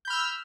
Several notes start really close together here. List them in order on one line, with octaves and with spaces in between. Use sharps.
G6 B5 F6 E6